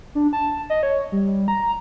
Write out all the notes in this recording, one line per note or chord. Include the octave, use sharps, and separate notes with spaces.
D4
A5
D#5
C#5
G3
A#5